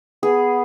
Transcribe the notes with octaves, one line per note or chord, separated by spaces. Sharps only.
B3 G#4